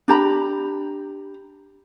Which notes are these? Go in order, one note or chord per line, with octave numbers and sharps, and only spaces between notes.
D4 G4 A#5 B5